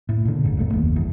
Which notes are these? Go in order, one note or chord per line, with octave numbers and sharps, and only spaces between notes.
A2
A#2 D3
G1 D2 G#2
E1 B1 A3
F#1 D#2
G1 E2